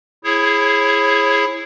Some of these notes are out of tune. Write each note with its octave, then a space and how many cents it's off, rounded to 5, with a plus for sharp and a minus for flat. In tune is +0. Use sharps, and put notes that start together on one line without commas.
E4 +10 G#4 +0 C#5 -35